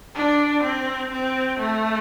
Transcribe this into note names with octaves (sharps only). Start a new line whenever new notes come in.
D4
C4
C4
A3